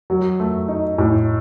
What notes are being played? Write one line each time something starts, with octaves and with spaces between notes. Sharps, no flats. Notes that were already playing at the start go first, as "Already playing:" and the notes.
F#3
A3
D#4
A2